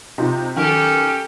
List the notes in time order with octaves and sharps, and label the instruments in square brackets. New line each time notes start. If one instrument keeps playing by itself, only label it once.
[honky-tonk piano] C3 D#4 F4
[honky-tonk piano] D#3 F#3 [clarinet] C#4 [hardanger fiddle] G4 A4